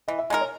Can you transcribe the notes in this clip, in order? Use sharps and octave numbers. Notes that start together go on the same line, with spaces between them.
E3 D#5
E5
G#3 D#4 A#4 D#5
C#5